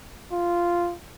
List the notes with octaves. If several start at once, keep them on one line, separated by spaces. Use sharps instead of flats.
F4